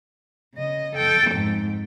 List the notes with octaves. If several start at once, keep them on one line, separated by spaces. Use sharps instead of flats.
C#3 D#5
A4 G5
F2 G#2